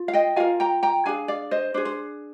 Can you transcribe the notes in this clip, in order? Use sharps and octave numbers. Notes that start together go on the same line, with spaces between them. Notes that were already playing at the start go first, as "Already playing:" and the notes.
Already playing: F4
F5
D#5 G5
F4 A#4 F5 G#5
G5 A#5
G5 A#5
D4 G#4 F5 G#5
D5 F5
C5 D#5
D4 G#4 C5
C5